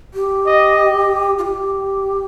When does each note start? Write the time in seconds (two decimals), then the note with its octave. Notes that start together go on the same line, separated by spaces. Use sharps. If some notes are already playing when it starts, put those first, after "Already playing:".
0.14 G4
0.47 D#5
1.38 F4
1.45 G4